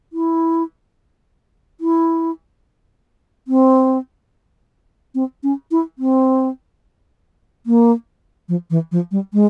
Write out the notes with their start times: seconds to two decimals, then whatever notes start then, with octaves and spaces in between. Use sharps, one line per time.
0.13 E4
1.81 E4
3.48 C4
5.15 C4
5.43 C#4
5.71 E4
5.98 C4
7.66 A#3
8.49 F3
8.70 E3
8.92 F3
9.11 G3
9.33 G#3